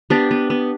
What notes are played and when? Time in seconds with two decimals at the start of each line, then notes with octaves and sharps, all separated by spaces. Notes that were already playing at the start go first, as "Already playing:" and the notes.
0.10 B3 D4 G4
0.31 B3
0.50 B3